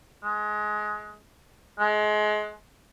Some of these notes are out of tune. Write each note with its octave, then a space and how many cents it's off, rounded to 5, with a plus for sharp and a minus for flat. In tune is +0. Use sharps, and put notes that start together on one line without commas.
G#3 +20
G#3 +30